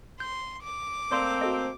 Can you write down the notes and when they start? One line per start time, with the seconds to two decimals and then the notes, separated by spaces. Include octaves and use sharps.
0.20 C6 G6
0.63 D6
1.12 A3 A#3 C4 D5 C6 G6
1.41 F#4 A4 D#5